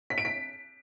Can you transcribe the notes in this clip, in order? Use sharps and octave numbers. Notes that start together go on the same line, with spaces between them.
B6
D7
B6